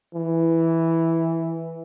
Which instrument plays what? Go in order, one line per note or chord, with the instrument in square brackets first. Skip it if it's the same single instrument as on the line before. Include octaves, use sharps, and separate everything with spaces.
[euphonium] E3